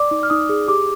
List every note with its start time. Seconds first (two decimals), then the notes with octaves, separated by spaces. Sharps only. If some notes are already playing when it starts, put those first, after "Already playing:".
Already playing: D5 D6
0.11 D#4
0.23 F6
0.30 D#4 D#6
0.49 G#4
0.68 G4 D6